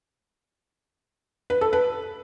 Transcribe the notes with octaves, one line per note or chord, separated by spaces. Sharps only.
B4
A4
B4